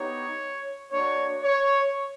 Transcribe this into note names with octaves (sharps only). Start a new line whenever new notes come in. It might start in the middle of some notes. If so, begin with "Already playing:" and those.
Already playing: B3 D#4 G4 C#5
A#3 D4 F#4 C#5
C#5